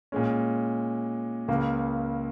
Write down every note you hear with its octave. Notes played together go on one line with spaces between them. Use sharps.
A#2 G#3 C#4
C#2 C#3 A#3